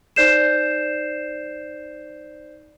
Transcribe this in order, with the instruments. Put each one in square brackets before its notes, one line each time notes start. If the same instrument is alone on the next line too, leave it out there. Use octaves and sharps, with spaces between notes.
[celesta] D#4 C5 D5 G6 C7 E7